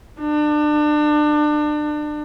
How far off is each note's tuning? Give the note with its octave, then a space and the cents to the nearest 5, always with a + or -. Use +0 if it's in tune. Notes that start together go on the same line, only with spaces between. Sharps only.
D4 +30